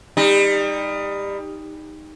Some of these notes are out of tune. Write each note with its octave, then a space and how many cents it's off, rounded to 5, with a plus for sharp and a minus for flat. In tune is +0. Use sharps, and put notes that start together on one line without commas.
G3 +25 D#4 +0